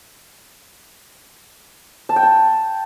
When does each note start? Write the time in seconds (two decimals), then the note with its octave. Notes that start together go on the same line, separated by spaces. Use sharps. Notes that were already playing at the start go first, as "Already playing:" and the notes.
2.09 A5
2.16 G5
2.23 A5